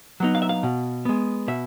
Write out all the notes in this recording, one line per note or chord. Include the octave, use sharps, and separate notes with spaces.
F#3 B3 D#4
F5
E5
F5
B2
G#3 B3
B2 E5